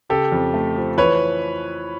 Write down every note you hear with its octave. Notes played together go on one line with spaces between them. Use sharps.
C#3 G4 A4
F2
A3
F3
E3 B4 C#5